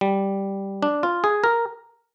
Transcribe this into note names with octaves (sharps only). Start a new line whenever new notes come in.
G3
D4
F4
G#4
A#4